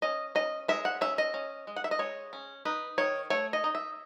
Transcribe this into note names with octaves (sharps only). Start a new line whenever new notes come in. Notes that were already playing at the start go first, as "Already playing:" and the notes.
C#4 D#5
C#4 D#5
G#3 E5
F#5
C#4 E5
D#5
C#4
G#3
F#5
E5
D#5
G#3 C#5
C#4
D#4 B4
D#3 C#5
A3 C#5
D#5
D#4
E5